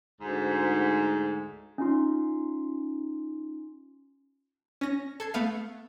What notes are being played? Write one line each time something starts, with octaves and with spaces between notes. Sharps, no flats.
D2 G#2
C#4 D#4 F4 C6
C#4 A#6
A4 G#6 C7
A3 B3 F5 C7